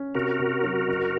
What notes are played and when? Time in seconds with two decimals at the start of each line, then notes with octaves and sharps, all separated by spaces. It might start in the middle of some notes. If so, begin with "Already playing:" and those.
Already playing: C#4
0.15 C3 F#4 A#4
0.39 C3
0.64 F#3
0.88 F#1